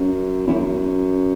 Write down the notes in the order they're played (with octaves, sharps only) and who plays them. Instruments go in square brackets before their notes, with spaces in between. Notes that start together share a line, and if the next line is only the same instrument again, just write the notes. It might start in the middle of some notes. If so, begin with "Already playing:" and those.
Already playing: [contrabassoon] F#2
E2
F#2